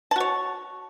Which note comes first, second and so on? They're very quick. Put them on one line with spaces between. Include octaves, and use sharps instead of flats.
A5 F#4 C#5